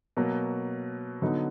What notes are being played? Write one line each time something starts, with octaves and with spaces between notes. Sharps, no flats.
B2 F#3 A#3
D3 F#3 B3 D#4